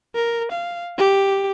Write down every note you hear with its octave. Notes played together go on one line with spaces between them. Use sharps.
A#4
F5
G4